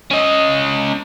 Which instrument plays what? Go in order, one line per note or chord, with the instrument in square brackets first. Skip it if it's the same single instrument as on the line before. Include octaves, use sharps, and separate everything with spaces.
[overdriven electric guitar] C#4 D#5